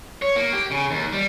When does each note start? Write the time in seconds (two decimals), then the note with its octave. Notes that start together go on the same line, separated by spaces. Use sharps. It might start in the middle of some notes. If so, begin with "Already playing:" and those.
0.22 C#5
0.36 A#3
0.53 G4
0.71 C#3
0.91 D#2
1.12 G3